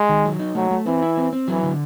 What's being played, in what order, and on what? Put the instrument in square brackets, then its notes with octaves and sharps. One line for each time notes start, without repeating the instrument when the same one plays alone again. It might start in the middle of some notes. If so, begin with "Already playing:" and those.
Already playing: [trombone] G#3
[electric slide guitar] D#3
F#3
D#4
[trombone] F#3 [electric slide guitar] A3
[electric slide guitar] A3
[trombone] E3 [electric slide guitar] C4
[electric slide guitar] E4
C4
C4
[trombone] E3 [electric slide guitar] F#3
[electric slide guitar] D3